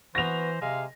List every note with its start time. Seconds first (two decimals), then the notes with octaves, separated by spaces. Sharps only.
0.15 E3 B3 F#4 C5 A#6 F7
0.62 C3 G#3 F5